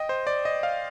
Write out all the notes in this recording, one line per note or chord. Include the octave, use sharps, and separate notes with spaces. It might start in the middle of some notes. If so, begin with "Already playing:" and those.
Already playing: D#5 G5
C5
D5
D#5
F5